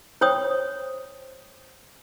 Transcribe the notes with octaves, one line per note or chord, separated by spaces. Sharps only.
C5 C#5 G5 D#6